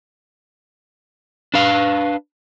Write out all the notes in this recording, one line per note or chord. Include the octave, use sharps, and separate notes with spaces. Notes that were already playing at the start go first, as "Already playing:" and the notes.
D4 B4 F5